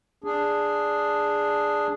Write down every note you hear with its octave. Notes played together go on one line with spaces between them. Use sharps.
D4 G#4